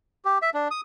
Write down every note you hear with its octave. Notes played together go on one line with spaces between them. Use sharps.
G4
E5
D4
D#6